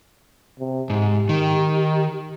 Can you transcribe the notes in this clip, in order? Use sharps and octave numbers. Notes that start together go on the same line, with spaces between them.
C3
G#2 G4
D#3